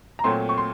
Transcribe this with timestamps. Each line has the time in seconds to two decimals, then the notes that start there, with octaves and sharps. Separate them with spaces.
0.19 A#5
0.24 A#2 F#3 A3 C4 C6
0.49 C#6
0.58 C6